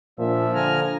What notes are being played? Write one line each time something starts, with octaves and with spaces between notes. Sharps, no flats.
A#2 F3 D4 E5
D3 G#5 A#5 F6